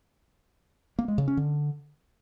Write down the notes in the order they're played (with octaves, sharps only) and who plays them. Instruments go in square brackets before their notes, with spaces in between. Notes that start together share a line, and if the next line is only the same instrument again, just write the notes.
[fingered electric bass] A#3
G#3
C#3
C#4
D3